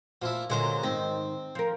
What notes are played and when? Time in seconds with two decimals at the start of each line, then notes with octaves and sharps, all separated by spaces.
0.22 A#2 F3 E4
0.50 A#2 D3 F#3 G#3 C5
0.83 G#2 D#3 C4 D#5
1.55 F3 A#4